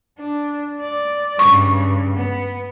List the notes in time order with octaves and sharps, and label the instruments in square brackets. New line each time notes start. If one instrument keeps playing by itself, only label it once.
[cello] D4
D5
[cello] G2 C#3 [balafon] C#6
[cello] B3